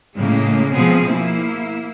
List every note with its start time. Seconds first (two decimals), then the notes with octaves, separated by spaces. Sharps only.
0.14 A2 C#3 G#3 A#3
0.72 B2 F3 B3 C4 G#4
1.04 A#3 E4